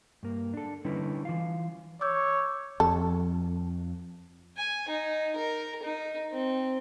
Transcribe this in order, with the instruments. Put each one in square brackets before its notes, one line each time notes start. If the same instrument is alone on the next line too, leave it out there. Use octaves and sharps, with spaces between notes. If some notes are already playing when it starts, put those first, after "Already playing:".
[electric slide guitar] G2 A#3
D4 A4
D3 G3 C#4 D#4 E4 B4
E3 F4 F5
[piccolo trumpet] C#5 [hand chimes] D6 E6 G6
[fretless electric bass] F2 [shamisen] A4
[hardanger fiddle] G#5
D#4
A#4
D#4
C4